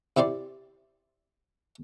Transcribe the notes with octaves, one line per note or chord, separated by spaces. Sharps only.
C3 E4 G4 D5 C6